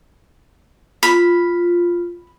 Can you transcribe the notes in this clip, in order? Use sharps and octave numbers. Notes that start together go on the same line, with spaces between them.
F4 B5